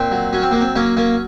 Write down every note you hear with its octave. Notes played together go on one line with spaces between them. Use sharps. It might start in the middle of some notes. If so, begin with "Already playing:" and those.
Already playing: A#2 C4
F#3
F#3 C#4
C4
F#3 A#3
C4
F#3 A#3 C#4
A#3 C#4